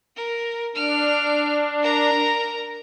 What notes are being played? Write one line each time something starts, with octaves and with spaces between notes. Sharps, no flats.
A#4
D4 F6 D7
A#4 A#5